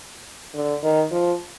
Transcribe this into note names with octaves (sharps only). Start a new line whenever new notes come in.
D3
D#3
F3